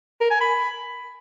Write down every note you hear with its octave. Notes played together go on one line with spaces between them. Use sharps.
A#4
G#5
B5